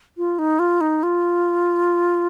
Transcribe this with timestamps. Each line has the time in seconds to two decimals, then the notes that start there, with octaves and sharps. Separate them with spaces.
0.17 F4
0.39 D#4
0.59 F4
0.81 D#4
1.03 F4